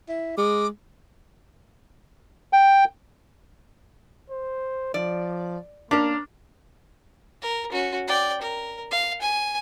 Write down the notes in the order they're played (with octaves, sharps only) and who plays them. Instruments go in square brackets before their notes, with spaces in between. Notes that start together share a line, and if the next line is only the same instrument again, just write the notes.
[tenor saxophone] E4
[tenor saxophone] G#3 [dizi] D6
[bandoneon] G5
[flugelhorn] C5
[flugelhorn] F3 [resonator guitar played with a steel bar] D5
[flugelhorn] A#3 [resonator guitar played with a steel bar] C#4 A#4 [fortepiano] D4
[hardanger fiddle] A#4
C#4 F#4
D5 G5
A#4
F5
G#5